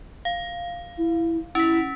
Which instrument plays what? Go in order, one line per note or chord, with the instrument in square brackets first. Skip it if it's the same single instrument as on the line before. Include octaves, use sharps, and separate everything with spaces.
[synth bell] F5
[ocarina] E4
[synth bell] C#4 B6 [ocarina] E4